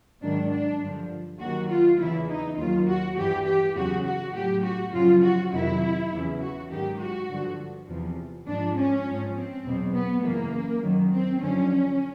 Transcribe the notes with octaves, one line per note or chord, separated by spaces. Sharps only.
G#2 D#3 F#3 D4
D4
G2 D3 F3
D#2 D#3 F#3 F#4
F4
E2 C#3 E3 E4
D#4
D#2 D#3 F#3 F4
F#4
G2 E3 G4
G4
E2 C#3 F#3 F#4
F#4
A2 G4
F#3
F#4
F#2 C#3 F3 F4
F#4
F2 C3 D#3 F#3 E4
E2 C#3 E3
F#4
G#2 D#3 F#3 G4
F#4
G2 D3 F3
E2 C3 F3
G#2 F3 D4
C#4
F3
G#2
C4
E2 B2 F#3
B3
F#2 C#3 E3 A#3
F#2 D#3 F#3
C4
F#2 D3 F3 C#4